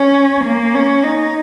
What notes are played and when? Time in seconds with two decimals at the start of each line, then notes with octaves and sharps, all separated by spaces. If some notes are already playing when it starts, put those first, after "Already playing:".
Already playing: C#4
0.45 A#3
0.74 C#4
1.04 D#4